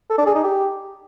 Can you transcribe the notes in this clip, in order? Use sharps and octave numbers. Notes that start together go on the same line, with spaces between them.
A4
D4
G#4
D#4
G4